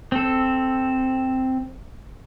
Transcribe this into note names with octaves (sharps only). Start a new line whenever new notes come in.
C4 A4